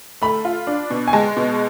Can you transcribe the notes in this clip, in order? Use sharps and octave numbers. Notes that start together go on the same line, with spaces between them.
A3 B5
F4
D4
B2
G#5
G#3 A5
B2